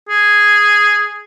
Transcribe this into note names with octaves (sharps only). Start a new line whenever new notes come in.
G#4